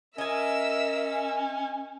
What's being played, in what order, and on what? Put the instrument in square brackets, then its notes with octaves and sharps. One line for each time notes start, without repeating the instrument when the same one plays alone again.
[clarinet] C#4 [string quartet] A#4 E5 E6 [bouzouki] D#5 G#5